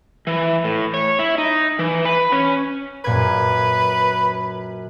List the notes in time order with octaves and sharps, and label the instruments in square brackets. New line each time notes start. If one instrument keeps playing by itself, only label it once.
[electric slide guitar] E3
A2
C#5
E4
D#4
E3
B4
C#4
[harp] F#2 A#2 G#6 [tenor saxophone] B4